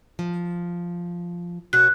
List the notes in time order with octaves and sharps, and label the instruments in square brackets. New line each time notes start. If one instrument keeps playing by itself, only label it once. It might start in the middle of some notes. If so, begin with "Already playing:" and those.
[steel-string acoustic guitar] F3
[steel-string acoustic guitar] B2 F#4 C#5 [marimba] F#6